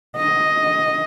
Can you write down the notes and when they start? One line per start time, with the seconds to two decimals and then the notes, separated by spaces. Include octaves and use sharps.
0.17 D#5